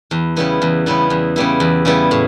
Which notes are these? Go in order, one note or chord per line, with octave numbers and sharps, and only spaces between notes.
E2
C#3 G3 B3 E4
E2
C#3 G3 B3 E4
E2
C#3 G3 B3 E4
E2
C#3 G3 B3 E4
A2